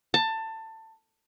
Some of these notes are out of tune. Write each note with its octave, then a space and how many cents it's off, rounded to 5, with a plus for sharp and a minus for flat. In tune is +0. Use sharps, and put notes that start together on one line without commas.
A5 +20